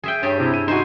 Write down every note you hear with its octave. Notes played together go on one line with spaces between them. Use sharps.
G#4 E5 G5
G2 G4 G#4 C#5
C3 E4
D#7
D#4 F#4 C5 G#5